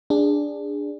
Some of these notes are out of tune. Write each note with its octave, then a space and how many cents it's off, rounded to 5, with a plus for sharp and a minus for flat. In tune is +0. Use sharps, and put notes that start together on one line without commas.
D4 +0 G#4 -20